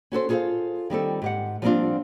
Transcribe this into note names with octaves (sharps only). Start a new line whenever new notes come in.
C#4 F#4 A4 C5
F4 G#4 A4 B4 C5 F5
D#3 G3 C4 A4
G#2 G4 F#5
F3 G3 A#3 C4 D4 F4